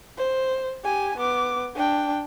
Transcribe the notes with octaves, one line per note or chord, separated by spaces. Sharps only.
C5
G4 G#5
B3 D6
D4 G5